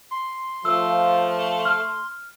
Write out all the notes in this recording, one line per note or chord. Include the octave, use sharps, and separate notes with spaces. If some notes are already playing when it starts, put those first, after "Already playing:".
C6
F3 A3 E6
F6